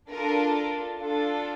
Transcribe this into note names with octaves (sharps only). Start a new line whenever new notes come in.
D4 F4 A4 A#4
D4 F4 A4